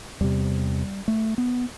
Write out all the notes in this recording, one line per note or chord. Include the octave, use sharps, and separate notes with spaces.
E2 C3 G3
A3
B3